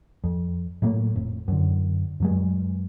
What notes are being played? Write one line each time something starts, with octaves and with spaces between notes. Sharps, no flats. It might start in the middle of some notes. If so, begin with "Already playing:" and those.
F2
A2 F#3 A3 A#3
F1
F#2 D3
F#2 F#3 G#3